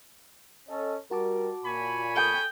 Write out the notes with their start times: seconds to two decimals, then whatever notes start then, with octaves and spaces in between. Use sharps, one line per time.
0.69 C#4 A4 D#5
1.11 G3 F#4 A#4 A5 D6
1.64 A#2 C#5 G#5 B5
2.16 A4 G5 D#6